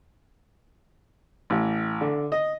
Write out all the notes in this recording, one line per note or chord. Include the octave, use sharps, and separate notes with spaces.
A1
D3
D#5